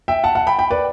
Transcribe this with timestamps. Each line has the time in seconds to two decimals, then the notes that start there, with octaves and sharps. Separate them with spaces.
0.08 E5 G5
0.24 F#5 A5
0.35 F#5 A5
0.47 G5 B5
0.59 G5 B5
0.71 B4 D5